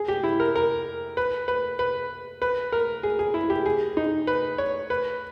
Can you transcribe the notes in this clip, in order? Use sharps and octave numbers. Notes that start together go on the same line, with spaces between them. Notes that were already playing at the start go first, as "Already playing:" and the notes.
Already playing: G#4
G4
E4
A#4
A#4
B4
B4
B4
B4
A#4
G#4
G#4
E4
G4
G#4
D#4
B4
C#5
B4